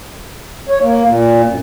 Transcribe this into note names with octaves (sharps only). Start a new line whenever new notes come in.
C#5
A#3
A#2
F#2